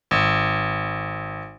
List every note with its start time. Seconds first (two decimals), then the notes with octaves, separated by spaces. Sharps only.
0.11 G#1